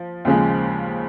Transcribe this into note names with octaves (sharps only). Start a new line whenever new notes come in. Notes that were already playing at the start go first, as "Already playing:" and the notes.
Already playing: F3
D#2 C#3 F3 G#3